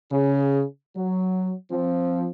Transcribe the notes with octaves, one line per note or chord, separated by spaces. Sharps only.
C#3 G#4
F#3
F3 C4